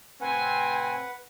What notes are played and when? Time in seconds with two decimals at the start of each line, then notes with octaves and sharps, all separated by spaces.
0.21 A2 C3 C4 B4 F#5 G#5